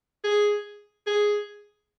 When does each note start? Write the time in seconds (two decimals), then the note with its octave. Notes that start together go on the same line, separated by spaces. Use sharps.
0.24 G#4
1.07 G#4